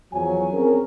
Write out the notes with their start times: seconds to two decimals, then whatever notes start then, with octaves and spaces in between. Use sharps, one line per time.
0.14 E2 F3 F#3 C#5 G#5
0.52 C4 C#4 G#4 A#4